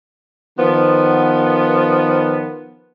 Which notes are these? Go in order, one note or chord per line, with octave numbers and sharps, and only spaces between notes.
D#3 F3 B3